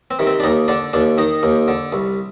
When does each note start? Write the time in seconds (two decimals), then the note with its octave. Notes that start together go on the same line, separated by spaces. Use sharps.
0.11 C4
0.19 C3 D#3
0.27 C4
0.40 D4
0.43 D#2 D#4
0.68 D3 D4
0.93 D#2 D4
1.18 D#3 D#4
1.43 D#2
1.68 D3
1.93 C2